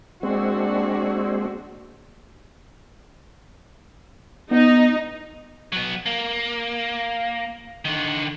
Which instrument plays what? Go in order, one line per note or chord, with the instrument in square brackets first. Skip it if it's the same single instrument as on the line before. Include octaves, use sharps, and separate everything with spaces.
[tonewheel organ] G#3 C4 [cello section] A#3 D4 F#4
[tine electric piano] B3 [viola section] D#4
[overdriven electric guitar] F#3 B3
A#3
D3 D#3